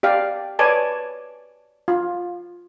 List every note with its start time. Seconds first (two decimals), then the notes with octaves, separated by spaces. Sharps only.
0.03 G4 D5 F5 G5
0.59 B4 C#5 D5 G#5 A5
1.88 F4